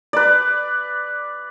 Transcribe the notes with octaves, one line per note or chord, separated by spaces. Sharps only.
B4 D5